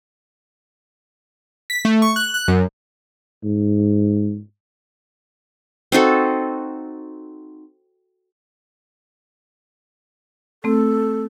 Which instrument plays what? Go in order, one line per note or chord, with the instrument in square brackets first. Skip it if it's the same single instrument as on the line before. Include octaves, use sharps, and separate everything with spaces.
[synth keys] B6
A3
C#6
F#6
F#6
F#2
[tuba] G#2
[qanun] C4 D#4 F#4 A4
[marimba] A3 C4 [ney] A4